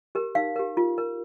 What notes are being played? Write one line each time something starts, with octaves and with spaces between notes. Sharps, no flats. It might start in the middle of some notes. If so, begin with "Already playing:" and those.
G4 A#4
D#4 F5
G4 A#4
F4
A#4